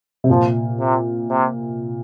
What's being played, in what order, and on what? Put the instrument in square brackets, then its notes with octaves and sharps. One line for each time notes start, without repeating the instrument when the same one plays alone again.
[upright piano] C3
[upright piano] A#2 [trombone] F3
[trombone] C3
C3